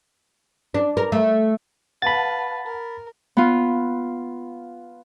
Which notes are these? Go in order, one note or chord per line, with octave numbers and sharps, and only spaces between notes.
D4
A#4
A3
B4 F5 F#5 A5 B5 A6
A#4
B3 F4